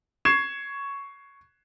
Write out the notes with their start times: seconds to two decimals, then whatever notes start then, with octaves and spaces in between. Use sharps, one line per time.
0.25 C#6 G#6 C7 E7